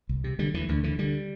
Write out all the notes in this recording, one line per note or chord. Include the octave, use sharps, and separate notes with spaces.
C2
C3
D3 G3
D2 E3
D2 D3
D3 E3
D3 G3